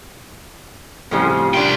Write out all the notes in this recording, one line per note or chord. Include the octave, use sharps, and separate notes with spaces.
F2 A2 C#3 F3 G3
C2 D4 F4 G5